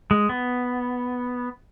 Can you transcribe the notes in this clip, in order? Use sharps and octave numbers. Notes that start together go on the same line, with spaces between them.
G#3
B3